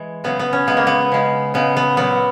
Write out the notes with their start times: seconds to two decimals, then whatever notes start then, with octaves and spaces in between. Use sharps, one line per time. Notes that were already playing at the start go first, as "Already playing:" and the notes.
Already playing: E3 G#3
0.24 C#3 F#3 B3
0.39 B3
0.53 C#4
0.67 C#3 G#3 B3
0.77 A#3
0.87 B3
1.12 C#3 G#3
1.54 C#3 G#3 B3
1.77 B3
1.97 A#2 F#3 B3